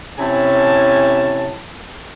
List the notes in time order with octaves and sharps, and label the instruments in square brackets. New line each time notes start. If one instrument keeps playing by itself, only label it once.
[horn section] C3 C#4 E4 G#5 A5